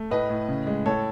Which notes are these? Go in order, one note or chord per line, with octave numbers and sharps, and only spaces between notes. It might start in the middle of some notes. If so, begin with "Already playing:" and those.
Already playing: A3
A2 B4 D#5
A2
C#3
G#3
A2 A4 C#5